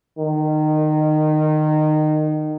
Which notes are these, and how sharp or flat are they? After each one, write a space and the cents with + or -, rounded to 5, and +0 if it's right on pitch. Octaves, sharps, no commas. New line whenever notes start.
D#3 -20